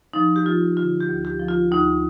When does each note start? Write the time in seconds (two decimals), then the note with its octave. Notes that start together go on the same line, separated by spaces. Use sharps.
0.14 F3 D#4
0.36 G4
0.46 F3 F4
0.77 D3 F4
1.01 G4
1.09 D2
1.25 G4
1.40 F3
1.49 F4
1.72 D2 D#4